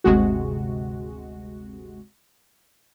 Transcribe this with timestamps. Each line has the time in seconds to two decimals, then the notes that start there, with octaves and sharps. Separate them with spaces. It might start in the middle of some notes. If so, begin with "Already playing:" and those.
0.04 G1 D2 C3 G#3 F#4